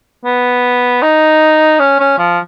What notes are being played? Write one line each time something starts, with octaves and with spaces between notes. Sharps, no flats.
B3
D#4
C#4
C#4
F3